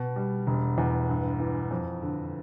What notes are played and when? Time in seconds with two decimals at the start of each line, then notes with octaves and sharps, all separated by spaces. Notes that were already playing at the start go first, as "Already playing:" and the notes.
Already playing: B2
0.16 G3
0.47 E1
0.78 E2
1.09 G2
1.40 E3
1.71 F2
2.02 D3